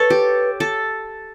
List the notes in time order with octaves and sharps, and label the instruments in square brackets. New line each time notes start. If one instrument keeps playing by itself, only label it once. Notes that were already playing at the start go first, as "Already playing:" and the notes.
Already playing: [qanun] A4 C#5 [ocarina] B4
[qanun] G4
A4